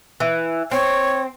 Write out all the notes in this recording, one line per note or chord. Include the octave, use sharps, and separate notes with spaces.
E3
C4 C#5